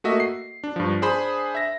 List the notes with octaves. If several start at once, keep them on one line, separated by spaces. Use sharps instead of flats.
A3 A#3 F#4 D#5 E5
C7
D4
G2 F3
D4 G#4 C5 B5
E5 A#6